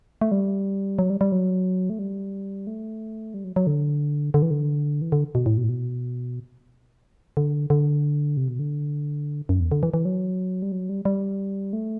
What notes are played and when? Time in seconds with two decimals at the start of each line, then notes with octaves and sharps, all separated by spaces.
0.21 A3
0.32 G3
0.99 F#3
1.10 G3
1.21 G3
1.32 F#3
1.90 A3
1.99 G3
2.67 A3
3.34 G3
3.44 F#3
3.56 F#3
3.67 D3
4.34 D3
4.42 E3
4.51 D3
5.02 E3
5.12 D3
5.35 B2
5.46 A2
5.57 B2
5.64 A2
5.69 B2
7.37 D3
7.70 D3
8.37 C3
8.48 B2
8.59 D3
9.49 F#2
9.60 E2
9.71 D3
9.83 E3
9.94 E3
10.05 F#3
10.62 G3
10.72 F#3
10.89 G3
11.05 G3
11.73 A3